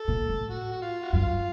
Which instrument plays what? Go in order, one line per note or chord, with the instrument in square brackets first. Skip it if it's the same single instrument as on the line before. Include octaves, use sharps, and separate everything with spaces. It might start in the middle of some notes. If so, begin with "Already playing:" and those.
Already playing: [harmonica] A4
[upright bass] A#2
A2
[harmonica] F#4
F#4
F4
F#4
[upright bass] F#2 [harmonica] F4